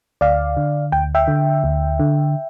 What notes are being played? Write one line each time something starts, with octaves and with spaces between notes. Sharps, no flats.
D2 D5 F5
D3
D2 G5
E5 G5
D3
D2
D3